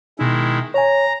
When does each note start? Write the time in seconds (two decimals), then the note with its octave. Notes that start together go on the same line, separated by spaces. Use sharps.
0.19 B2 D#3 G#3 D#4 E4
0.74 C#5 G#5 A#5